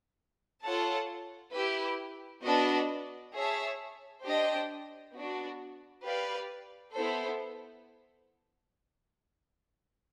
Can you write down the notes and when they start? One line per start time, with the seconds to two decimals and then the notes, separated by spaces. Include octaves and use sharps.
0.62 F4 A4 C#5 F#5 A5
1.53 E4 G4 B4
2.44 B3 D4 F#4 B4 D#5
3.34 G#4 C#5 E5 A5
4.24 D4 G4 C5 D#5 G5
5.15 B3 D4 F#4
6.04 G4 B4 D5 F5
6.95 B3 E4 A4 C5